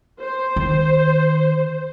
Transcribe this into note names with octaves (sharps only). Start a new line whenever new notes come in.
C5
D#3